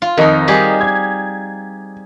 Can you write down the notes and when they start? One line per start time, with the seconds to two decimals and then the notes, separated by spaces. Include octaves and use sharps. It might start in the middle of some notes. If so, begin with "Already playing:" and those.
0.02 F4
0.17 F2 D#3 D#4 D#5
0.48 G3 G4 G#4
0.81 G#6